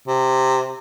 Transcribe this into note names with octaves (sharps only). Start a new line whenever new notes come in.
C3